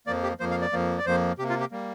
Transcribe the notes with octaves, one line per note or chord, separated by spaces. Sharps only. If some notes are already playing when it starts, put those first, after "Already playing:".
F2 F3 A#3 D5
G4
F2 F3 A#3 C5
F5
D5
F2 F3 A#3
D5
F2 F3 A#3 C5
C3 A#3 G4
F4
G4
G3 A#3